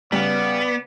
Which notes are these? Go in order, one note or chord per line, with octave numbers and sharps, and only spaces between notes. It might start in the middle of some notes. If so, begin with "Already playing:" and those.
C#3 G3 B3 D5